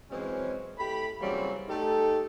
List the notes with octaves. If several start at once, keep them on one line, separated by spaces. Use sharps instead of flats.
E3 F#3 G#3 C4 C#4
A2 A3 G4 B5
C#3 E3 F#3 G3 A#3 C4
A3 D#4 G4 A4